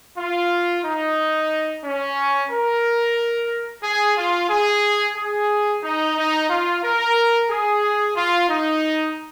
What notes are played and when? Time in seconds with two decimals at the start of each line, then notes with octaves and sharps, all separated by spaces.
0.19 F4
0.84 D#4
1.85 C#4
2.52 A#4
3.84 G#4
4.18 F4
4.50 G#4
5.17 G#4
5.84 D#4
6.17 D#4
6.50 F4
6.84 A#4
7.50 G#4
8.16 F4
8.50 D#4